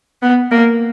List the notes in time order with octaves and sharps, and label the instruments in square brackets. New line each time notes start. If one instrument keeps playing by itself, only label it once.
[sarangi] B3
A#3